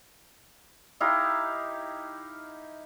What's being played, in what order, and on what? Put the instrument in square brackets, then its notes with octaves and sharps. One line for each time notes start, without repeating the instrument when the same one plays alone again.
[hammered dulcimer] D#4 E4 G4 F5